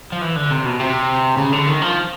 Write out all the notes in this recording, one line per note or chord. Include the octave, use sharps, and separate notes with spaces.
F3
E3
D3
C3
B2
C3
C#3
D3
D#3
F3